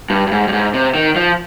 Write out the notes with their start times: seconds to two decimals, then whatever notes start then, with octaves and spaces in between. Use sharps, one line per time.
0.10 G2
0.27 G2
0.32 G#2
0.48 G2
0.53 G#2
0.74 C3
0.95 D#3
1.16 F3